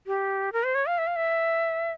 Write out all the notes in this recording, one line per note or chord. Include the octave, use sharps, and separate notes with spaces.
G4
A#4
C5
C#5
F5
E5
F5
E5